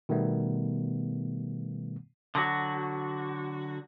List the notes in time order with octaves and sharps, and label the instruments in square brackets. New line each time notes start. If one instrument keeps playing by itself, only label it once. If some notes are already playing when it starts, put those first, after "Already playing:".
[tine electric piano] B2 D#3 G3 A3 B3
[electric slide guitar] D3 F#3 F#4